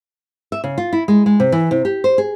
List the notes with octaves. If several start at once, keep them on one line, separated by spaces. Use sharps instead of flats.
E5
C#3
F4
E4
G#3
G#3
C3
E3
C3
G4
C5
G#4